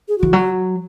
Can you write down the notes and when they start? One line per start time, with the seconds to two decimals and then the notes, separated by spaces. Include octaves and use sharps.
0.08 G#4
0.18 E3 F#4
0.33 F#3 F#4